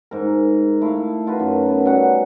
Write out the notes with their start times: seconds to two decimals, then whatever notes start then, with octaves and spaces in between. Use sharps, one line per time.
0.11 G#2 A#4
0.81 A3 E4 F5
1.26 D#4 F4 F#4 B4
1.40 F#2
1.69 B3
1.85 F#3 G3 C#4 F#5